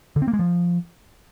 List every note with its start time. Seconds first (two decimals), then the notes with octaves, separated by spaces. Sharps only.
0.16 D3
0.22 C4
0.28 A#3
0.33 G#3
0.39 F3